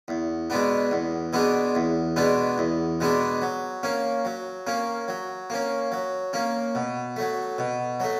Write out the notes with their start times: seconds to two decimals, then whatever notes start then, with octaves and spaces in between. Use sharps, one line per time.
0.08 E2
0.50 B2 G#3 B3 D4
0.91 E2
1.33 B2 G#3 B3 D4
1.75 E2
2.16 B2 G#3 B3 D4
2.58 E2
3.00 B2 G#3 B3 D4
3.42 F#3
3.83 A#3 C#4
4.25 F#3
4.67 A#3 C#4
5.08 F#3
5.50 A#3 C#4
5.92 F#3
6.33 A#3 C#4
6.75 B2
7.16 F#3 A3
7.58 B2
8.00 F#3 A3